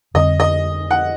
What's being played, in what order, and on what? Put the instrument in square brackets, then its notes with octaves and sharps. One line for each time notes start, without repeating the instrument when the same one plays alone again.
[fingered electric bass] F2 D3 G3 C4 [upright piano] D#5
[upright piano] D#5
F#5